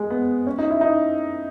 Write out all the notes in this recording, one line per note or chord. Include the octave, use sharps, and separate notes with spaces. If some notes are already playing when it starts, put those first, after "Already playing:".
Already playing: G#3
B3
C#4
D#4
E4
D#4